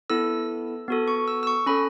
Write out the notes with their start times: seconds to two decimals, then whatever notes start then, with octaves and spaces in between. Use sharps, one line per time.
0.10 B3 E4 A4 E6
0.88 B3 F#4 A4
1.08 C#6
1.28 E6
1.43 E6
1.47 C#6
1.66 C#4 A4 B5